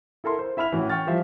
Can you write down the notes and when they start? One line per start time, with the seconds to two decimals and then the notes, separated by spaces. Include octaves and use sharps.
0.24 E4 A4 A#4 C6
0.39 C5
0.57 E4 E5 B5 F6 F7
0.72 A2 E3 C#4 F#4
0.89 G5 C#6 F6 A6
1.07 E3 F3 G3 C5 E5